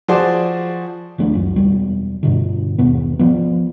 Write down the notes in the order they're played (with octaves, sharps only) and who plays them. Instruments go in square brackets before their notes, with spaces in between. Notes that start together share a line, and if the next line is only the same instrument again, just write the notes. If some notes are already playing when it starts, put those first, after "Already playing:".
[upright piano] F3 F#4 G#4 C5 D5
[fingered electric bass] D#1 F3 A3 D4
C#2 F#2
E1 G3
G2 B2 D3
D#2 B2 B3
F3 B3